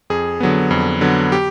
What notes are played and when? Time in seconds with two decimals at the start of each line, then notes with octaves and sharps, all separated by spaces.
0.10 F2 G#4
0.40 D3 F#3 B3
0.71 F2
1.01 D3 F#3 B3
1.32 G4